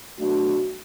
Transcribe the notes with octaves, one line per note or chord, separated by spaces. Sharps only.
B2 F#3 A3 D4 F#4